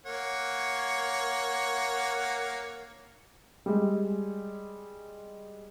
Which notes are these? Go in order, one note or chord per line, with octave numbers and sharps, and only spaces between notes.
A#3 C#5 F#5
G3 G#3